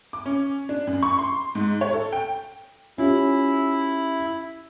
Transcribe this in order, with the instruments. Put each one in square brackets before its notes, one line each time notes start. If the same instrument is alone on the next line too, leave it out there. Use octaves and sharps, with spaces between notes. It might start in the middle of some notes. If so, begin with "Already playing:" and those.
[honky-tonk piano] D6
C#4
D4
F#2
C#6
C6
G#2
C#5
A4
G5
[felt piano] C#4 F4 G4 [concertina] E4